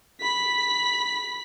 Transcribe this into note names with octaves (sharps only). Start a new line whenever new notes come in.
B5 B6